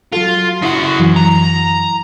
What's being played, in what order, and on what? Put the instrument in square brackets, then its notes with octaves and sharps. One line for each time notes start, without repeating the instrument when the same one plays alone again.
[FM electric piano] F#3 F#4 A4 [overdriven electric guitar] F4
[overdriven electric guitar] C#3 F#4 [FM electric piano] E4 C6
[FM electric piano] F#2 E3 F#3
[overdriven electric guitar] A#5